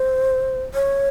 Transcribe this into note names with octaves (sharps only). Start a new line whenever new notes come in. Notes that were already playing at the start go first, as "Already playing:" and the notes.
Already playing: C5
C#5